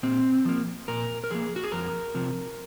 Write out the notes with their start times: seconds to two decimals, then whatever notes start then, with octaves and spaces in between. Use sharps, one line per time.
0.03 A#2 C4
0.45 F3 A#3
0.88 A#2 A#4
1.24 A#4
1.31 F3 A#3 G#4
1.56 F#4
1.63 G#4
1.72 F2 A#4
2.15 C3 F3